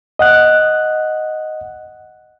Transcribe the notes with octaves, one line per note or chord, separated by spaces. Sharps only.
D#5 F#5 F#6